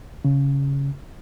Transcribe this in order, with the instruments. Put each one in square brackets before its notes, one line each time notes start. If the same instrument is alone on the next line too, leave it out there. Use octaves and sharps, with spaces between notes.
[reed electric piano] C#3